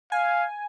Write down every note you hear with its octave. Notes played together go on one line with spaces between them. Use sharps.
F5 G#5